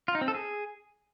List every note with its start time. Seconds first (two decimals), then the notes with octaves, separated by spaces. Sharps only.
0.08 F4
0.15 D#4
0.21 C4
0.28 A4
0.34 G#4